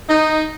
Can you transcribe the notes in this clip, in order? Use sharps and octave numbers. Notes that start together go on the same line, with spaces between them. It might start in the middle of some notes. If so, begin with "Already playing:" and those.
D#4